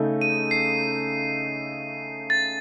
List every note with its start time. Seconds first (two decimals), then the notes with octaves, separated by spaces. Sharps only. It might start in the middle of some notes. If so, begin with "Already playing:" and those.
Already playing: C#3 A3 D#4 A4
0.21 D#7
0.51 C7
2.30 A6